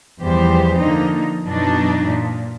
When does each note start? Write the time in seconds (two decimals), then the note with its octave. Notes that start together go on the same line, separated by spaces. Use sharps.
0.21 E2 F3 G3 G4 C5
0.79 D3 F3 A#3 D#4
1.44 F#2 B2 E3 F#3 D4 D#4
2.06 A#2